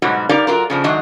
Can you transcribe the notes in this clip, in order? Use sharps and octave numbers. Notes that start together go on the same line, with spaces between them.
G#2 B2 F#3 G3 F#4
G3 D#4 G4 A#4 D5 F5
F#3 F4 A#4
C#3 F3 D4
G#2 D#3 F#3 D4 D#5